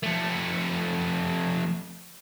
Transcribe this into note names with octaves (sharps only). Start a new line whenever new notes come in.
F2 A3